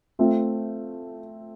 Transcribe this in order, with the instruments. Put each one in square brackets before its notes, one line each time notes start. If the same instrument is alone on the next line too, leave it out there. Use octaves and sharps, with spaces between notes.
[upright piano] A3 C4 F4